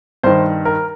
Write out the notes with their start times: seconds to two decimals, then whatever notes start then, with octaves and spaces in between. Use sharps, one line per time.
0.23 G2 D#3 C5
0.65 A#4